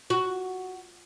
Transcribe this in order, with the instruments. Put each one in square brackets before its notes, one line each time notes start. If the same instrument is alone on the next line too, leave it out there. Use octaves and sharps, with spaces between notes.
[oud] F#4